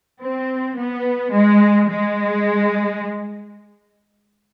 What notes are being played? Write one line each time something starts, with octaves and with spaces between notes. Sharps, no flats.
C4
B3
G#3
G#3